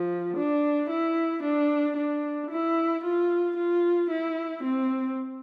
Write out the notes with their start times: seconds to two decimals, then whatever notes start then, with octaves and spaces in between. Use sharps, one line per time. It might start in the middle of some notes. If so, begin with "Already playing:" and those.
Already playing: F3
0.35 D4
0.89 E4
1.42 D4
1.95 D4
2.50 E4
3.03 F4
3.57 F4
4.10 E4
4.63 C4